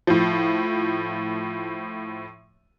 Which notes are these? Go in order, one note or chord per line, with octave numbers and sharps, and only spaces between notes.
A2 F3